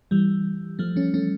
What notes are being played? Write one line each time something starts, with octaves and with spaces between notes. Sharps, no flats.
E3 G3
F3 A3
A3 C#4
A3 C#4